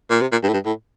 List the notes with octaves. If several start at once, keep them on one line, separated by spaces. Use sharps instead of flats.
A#2
C3
A#2
G2
A2
G2
A2